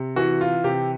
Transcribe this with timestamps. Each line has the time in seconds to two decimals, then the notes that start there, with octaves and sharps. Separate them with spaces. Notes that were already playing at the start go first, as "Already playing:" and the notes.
Already playing: C3
0.16 E3 F#4
0.41 F4
0.64 C3 G4